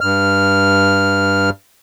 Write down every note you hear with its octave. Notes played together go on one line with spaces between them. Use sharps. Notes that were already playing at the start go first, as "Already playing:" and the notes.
G2 F6